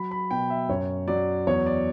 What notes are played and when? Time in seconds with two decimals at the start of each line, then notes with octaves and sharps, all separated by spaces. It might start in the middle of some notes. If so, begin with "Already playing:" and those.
Already playing: F#3 B5
0.11 B5
0.31 B2 G5
0.50 E5
0.69 F#2 C#5
1.07 F#3 D5
1.47 E2 C#5
1.66 D5